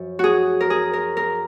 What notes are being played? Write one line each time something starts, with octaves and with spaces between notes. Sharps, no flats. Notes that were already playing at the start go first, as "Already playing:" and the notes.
Already playing: F#2 F3
F#4 G#4
A#4
G#4
A#4
A#4